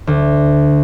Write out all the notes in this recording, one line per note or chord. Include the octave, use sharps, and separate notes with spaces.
D2